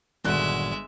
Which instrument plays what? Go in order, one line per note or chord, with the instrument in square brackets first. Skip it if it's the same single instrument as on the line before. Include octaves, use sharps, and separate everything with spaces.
[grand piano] G1 F#6 [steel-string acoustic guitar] A#2 D#3 F#3 [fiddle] G#3 E5